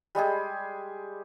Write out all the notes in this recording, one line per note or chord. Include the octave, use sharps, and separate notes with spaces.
G3 G#3 G4 G#4